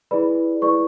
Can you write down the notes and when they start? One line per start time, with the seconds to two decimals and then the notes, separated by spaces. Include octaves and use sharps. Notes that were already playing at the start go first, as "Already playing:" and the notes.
0.11 E4 G#4 B4 D5 B5
0.62 E4 G#4 B4 D5 C#6